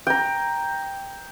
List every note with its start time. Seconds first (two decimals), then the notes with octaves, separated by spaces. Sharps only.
0.07 G5 A#5